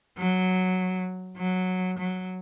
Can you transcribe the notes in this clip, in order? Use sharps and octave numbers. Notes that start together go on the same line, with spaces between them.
F#3
F#3
F#3